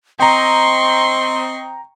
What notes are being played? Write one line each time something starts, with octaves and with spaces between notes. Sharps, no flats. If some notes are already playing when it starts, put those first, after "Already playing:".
C4 D#5 G5 A#5 C6 C#6 C7